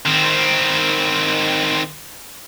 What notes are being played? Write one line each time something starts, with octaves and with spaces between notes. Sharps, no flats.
D#3 C4